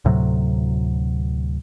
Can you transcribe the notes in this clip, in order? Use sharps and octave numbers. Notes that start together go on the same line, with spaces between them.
D2 A2 C3 F#3